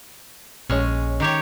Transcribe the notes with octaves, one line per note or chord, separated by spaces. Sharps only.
A#1 G#3 C#4 C#5
D#3 G4 C#5